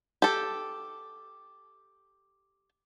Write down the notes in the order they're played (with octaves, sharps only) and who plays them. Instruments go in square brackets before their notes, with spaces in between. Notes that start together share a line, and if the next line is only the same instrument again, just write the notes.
[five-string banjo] G4 A4